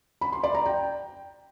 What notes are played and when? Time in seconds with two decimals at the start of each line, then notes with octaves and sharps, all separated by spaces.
0.21 B5
0.32 C6
0.43 D5
0.55 A#5
0.66 G5